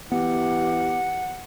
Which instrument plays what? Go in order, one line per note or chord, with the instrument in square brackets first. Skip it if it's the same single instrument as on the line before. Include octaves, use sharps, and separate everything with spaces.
[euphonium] E3 [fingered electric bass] B3 [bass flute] G4 [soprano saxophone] F#5